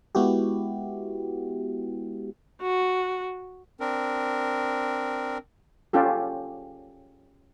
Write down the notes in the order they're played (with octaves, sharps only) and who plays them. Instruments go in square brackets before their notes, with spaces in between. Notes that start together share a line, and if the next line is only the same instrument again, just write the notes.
[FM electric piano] G#3 B3 E4 F#4 G4
[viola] F#4
[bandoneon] C4 D4 A#4
[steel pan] C#4 F4 G4 A4